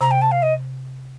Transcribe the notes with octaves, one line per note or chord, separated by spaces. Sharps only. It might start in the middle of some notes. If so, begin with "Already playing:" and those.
C3 A#5
G5
A5
F5
D#5